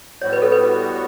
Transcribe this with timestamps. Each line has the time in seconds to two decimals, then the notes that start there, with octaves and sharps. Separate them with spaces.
0.21 A2 G3 B3 F#4 C#5
0.33 B4
0.42 A4
0.52 B4